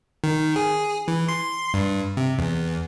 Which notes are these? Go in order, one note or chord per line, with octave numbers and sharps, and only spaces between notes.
D#3
G#4
E3
C6
G2
C3
E2